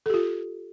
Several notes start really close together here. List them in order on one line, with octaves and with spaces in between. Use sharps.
A4 G4 F4